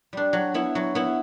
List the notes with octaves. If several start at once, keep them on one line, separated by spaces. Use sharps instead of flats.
G3 D4
F#3
B3 E4
F#3
B3 E4